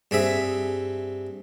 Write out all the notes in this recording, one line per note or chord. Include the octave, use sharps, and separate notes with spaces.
G2 C4 G#4 E5